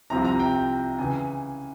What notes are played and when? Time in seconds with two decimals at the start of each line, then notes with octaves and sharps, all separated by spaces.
0.10 C2 C3 F3 C4 E4 A#5
0.25 A#5
0.39 G5
0.54 G5
0.99 C#3 E3 G#5